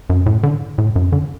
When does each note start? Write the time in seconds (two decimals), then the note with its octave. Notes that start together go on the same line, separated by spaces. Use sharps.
0.10 F#2
0.26 A2
0.43 D3
0.78 A2
0.96 F#2
1.12 D3